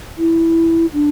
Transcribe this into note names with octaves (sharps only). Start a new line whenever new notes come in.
E4
D4